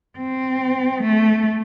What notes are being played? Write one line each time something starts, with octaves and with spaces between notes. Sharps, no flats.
C4
A3